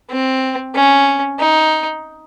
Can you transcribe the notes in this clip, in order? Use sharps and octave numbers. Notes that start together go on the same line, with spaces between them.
C4
C#4
D#4